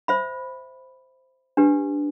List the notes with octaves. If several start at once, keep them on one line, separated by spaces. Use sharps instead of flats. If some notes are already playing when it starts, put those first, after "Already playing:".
C5 E5 B5
D4 G4 B4